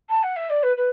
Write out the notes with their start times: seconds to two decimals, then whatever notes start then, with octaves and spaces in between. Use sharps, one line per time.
0.09 A5
0.23 F#5
0.36 E5
0.50 D5
0.63 B4
0.77 B4